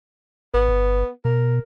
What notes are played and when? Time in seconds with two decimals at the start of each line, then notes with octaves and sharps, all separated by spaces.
0.54 G#1 B3
0.69 G1
1.25 B2 A#4